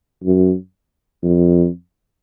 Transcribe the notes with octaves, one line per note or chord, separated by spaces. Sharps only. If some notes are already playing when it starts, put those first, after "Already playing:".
F#2
F2